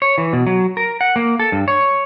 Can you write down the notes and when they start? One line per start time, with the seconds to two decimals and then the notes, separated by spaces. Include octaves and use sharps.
0.02 C#5
0.18 E3
0.33 B2
0.47 F#3
0.77 A#4
1.01 F#5
1.16 A#3
1.39 A4
1.52 G2
1.68 C#5